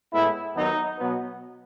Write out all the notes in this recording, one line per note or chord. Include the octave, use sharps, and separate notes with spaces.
A2 G#3 B3 E4
D#2 D#3 F#3 B3 D#4
B2 F#3 B3